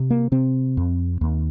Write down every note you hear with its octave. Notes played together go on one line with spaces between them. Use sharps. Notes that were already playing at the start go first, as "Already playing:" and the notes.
Already playing: C3
A#3
C3 C4
F2
D#2